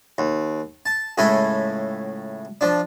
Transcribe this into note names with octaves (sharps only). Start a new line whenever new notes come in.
D#2
A5
C#2 A2 A3 E4 G#5
F3 D4